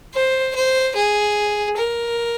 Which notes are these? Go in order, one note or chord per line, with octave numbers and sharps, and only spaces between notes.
C5
C5
G#4
A#4